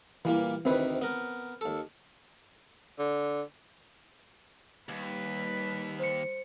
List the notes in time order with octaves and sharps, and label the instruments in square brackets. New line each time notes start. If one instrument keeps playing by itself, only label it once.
[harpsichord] A#2 G3 A#3 [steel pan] E3
[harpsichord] D2 C3 D#3 [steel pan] C4 B4
[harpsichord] B3 A#4
D#2 A4
[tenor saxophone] D3
[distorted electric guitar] D#2 [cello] G3 B4
[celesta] C5 C#7